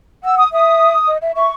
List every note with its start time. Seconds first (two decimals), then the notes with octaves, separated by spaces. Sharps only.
0.24 F#5 E6
0.37 D#6
0.52 E5 D#6
1.07 D#5
1.22 E5
1.35 E5 C#6